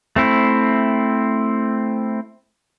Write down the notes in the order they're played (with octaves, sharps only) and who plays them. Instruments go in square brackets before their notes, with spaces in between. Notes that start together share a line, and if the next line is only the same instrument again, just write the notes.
[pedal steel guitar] A3 C4 E4